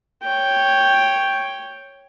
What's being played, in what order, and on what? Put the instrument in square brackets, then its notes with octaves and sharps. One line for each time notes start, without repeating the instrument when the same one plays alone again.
[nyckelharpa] C#5 G5